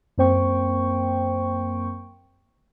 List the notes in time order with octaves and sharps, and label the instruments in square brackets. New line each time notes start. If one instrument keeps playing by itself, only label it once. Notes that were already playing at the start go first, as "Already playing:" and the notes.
[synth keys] F#2 A#3 C4 C5 G5 C#6